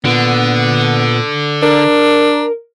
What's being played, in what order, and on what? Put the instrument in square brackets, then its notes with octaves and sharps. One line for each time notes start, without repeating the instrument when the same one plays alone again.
[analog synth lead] A#2 [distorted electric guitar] D3 [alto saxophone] B3
[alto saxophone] D4 [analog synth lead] A#4